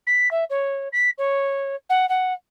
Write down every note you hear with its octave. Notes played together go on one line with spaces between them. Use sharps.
B6
E5
C#5
B6
C#5
F#5
F#5